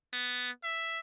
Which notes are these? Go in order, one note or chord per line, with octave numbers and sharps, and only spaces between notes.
B3
E5